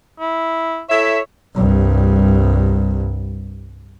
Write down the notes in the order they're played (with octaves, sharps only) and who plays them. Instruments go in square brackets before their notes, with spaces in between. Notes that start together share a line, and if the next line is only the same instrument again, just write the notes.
[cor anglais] E4
[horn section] E4 A4 E5 [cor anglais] C#5
[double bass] C2 G2